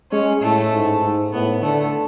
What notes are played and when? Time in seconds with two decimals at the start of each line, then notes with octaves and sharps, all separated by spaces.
0.11 G#3 C#4
0.41 A2 A3
0.73 G#2
1.02 G#2
1.32 A2 B3
1.62 D3 A3